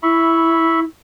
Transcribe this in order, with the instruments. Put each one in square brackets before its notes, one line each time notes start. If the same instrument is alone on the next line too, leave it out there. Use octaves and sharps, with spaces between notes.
[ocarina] E4 [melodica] E5 B5 C#6